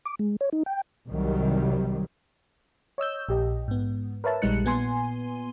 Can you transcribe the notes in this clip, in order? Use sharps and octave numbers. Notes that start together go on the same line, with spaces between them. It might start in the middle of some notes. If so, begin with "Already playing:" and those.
D6
G#3
C#5
D#4
G5
C2 C3 D#3 F#3 G3
C#5 D#5 E6 G6
A#1 G4 D#5
G#2 B3
A#4 B4 C#5 E5 A5
A#1 G3 G#3 D#4 F#6 C#7
A#2 B3 G#5 C6